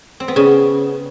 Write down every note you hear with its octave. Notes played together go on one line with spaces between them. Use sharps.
C4
B3
C#3